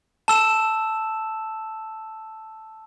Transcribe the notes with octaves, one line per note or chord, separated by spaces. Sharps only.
A5 E6 E7